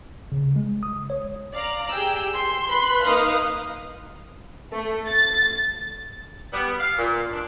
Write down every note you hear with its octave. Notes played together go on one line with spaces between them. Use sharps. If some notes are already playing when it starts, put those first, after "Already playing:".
C#3
G#3
D#6
C#5
D5 F5 A#5
G4 G#4 G5 E6
C6
B4 B5 C6 F#6
A#3 D#4 B4 F5 D#6
A3
A6
G3 B3
F5
A#2
D4